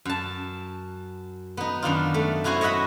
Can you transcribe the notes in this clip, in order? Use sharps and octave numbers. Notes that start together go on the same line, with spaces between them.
F#2 A5
B3 D#4
F#2 D#3 D4 F4
A3
C#4 E4 F#4 C5 G#5
C#5 D#5 E5 F#5 B5